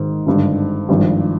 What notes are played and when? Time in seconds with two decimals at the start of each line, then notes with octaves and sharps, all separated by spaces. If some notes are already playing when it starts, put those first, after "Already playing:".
Already playing: G#1 G#2 D#3
0.26 G#1 G2 D3
0.89 G#1 G2 F3